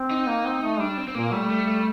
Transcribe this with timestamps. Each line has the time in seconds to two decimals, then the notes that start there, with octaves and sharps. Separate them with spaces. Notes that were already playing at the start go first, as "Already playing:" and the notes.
Already playing: C4
0.11 D#4
0.27 A#3
0.45 C4
0.62 A3
0.80 G3 D4
0.98 C4
1.08 C4
1.15 A#2 A#3
1.32 G3 A3
1.50 A3
1.67 A3